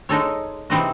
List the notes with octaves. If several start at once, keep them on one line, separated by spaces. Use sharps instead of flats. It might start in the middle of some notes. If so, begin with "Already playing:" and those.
G#3 D#4 A4 C#5
C3 E3 C4 D#4 F#4